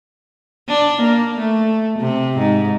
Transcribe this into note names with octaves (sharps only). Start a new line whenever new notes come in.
D4
A#3
A3
C3
G#2